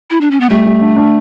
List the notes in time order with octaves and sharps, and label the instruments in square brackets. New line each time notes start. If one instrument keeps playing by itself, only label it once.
[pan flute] E4
D4
C#4
B3
[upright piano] G3 [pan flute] A3
[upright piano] G3
D4
D4